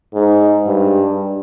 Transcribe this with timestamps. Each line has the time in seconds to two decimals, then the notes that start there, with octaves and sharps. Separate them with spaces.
0.14 G#2
0.66 G2